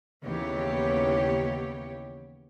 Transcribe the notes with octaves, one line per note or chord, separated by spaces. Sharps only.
D#2 C#3 E3 B3 G4 C#5